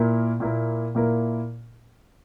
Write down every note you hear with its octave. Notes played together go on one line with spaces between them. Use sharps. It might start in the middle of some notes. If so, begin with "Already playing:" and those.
Already playing: A#2 A#3 E4 A#4
A#2 A#3 E4 A#4
A#2 A#3 E4 A#4